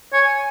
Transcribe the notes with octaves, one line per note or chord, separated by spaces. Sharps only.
C#5 G#5